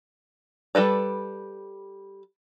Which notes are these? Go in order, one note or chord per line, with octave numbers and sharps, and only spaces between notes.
G3 A4 B4 D5